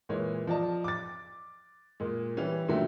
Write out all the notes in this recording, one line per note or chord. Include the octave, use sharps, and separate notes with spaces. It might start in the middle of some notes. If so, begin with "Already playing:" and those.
A#2 E3 G#3 C#5
F3 F4 D5 D#5 A5
D6 A6
A#2 G#3
E3 G3 C#4
A#2 D3 D#3 F#3 G3 A3